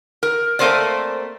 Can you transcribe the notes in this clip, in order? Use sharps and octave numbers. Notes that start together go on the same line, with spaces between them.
A#4
A3 A#3 C4 A#4 C5 D5